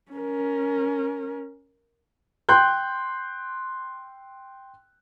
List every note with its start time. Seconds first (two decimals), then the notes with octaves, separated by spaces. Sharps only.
0.12 C#4 A#4
2.49 G5 C6 F#6 G6